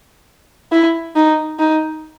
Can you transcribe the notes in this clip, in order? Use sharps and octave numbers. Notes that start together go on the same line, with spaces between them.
E4
D#4
D#4